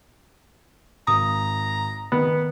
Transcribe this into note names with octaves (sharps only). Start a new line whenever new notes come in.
G#1 A#5 D#6
D#3 B3